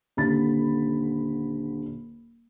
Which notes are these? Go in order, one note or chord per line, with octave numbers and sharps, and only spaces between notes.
D#1 D3 B5 A6